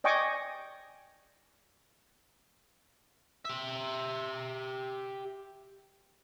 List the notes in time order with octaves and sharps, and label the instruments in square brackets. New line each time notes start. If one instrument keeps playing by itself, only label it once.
[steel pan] D5 D#5 G5 G#5 C#6 D6
[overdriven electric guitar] G4 E5